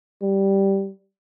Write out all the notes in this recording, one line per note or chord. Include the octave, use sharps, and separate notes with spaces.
G3